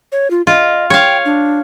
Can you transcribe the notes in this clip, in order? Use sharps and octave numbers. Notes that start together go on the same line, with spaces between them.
C#5
F4
F4 D#5
C#5 F5 G5
D4